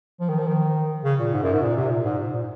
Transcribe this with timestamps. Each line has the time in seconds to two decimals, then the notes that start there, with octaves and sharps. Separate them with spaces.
0.20 F3
0.29 D#3
0.39 F3
0.47 D#3
1.04 C#3
1.20 A#2
1.33 G#2
1.43 F#2
1.53 G#2
1.62 A#2
1.76 C3
1.90 A#2
2.04 G#2
2.18 G#2
2.32 A#2